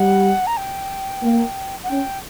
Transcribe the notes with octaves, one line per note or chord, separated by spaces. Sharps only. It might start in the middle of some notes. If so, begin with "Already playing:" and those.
Already playing: G3 F#5
A#5
G5
A#3
F#5
C#4 G5